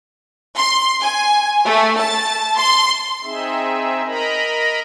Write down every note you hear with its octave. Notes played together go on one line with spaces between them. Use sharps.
C6
G#5
A3
A5
C6
C4 D#4 G#4 E5
A#4 D#5 A#5 B5